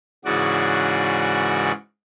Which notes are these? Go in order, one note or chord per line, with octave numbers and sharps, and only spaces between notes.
G#2 C#3 E3 F#4 D5